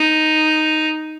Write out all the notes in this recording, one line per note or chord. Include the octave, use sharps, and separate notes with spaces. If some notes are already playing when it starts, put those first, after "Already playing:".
Already playing: D#4